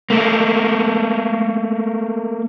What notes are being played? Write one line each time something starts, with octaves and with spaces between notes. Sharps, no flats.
A3 A#3